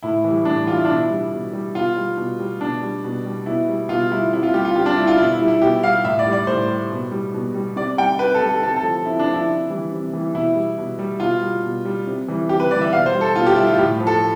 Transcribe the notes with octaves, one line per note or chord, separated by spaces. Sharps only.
A2 E4
E3 G3
A2 D4
E3 G3 F4
E4
D4
B2
E4
G3
B2
G3
B2 F4
G3
B2
G3
B2 D4
G3
B2
G3
B2 E4
G3
B2 F4
G3 E4
C3 E4
F4
G3 G4
F4
C3 G4
D4
G3 E4
F4
B2 E4
E4
G3
E4
B2 G4
G3 F5
A2 E5
D5
G3
D5
A2 C5
G3
B2
G3
B2
G3
C3 D5
G3 G5
C3 B4
A4
G3
A4
C3 A4
A4
F3
C3 E4
D4
F3
E4
C3
E3 G3
C3
E3 G3
B2 E4
G3
B2
G3
B2 F4
G3
B2
G3
C3
E3 G3
C3 G4
B4
E3 G3 D5
E5
B2 F5
C5
G3
A4
B2 F4
G4
G3 E4
F4
A2 G4
F3
A4